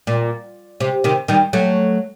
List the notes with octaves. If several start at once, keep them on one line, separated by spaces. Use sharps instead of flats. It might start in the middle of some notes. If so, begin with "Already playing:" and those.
A#2
C3
C3 D#3
D#3 G3
F#3 A3